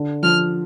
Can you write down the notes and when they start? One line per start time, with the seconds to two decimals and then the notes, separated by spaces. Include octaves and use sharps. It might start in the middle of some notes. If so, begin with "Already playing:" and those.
Already playing: D3
0.23 F3 F6